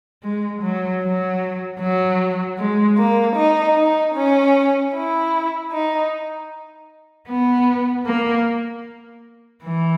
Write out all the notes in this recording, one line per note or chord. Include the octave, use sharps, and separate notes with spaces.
G#3
F#3
F#3
F#3
G#3
A#3
D#4
D#4
C#4
E4
D#4
B3
A#3
E3